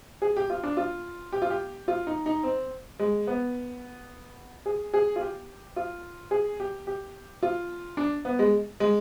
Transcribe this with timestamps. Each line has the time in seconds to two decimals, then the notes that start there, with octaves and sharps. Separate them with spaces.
0.22 G#4
0.37 G4
0.50 F4
0.63 D4
0.77 F4
1.32 G4
1.42 F4
1.50 G4
1.88 F4
2.07 D#4
2.26 D#4
2.43 C4
2.99 G#3
3.27 B3
4.66 G#4
4.94 G#4
5.16 F4
5.21 G4
5.76 F4
6.31 G#4
6.60 G4
6.87 G4
7.43 F4
7.97 D4
8.25 B3
8.39 G#3
8.80 G#3